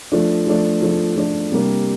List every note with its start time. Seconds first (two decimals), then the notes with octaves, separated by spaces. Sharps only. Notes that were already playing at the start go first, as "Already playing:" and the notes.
0.12 F3 A3 D4
0.47 F3 A3 D4
0.82 F3 A3 D4
1.16 F3 A3 D4
1.52 C3 G3 A#3 D4